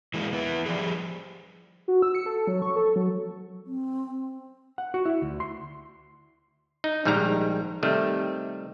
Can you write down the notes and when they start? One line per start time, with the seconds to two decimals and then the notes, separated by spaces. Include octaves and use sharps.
0.14 E3 G#3 A#3
0.33 E3 B3
0.66 F3 G3 G#4
1.88 F#4
2.02 E6
2.15 C#7
2.26 A4
2.47 F#3
2.62 C#6
2.76 A4
2.96 F#3
3.66 C4
4.78 F#5
4.94 F#4
5.05 E4
5.22 D2
5.40 C6
6.84 D#4
7.05 A#1 G#2 D#3 G3 A#5
7.83 C3 D#3 G3 A3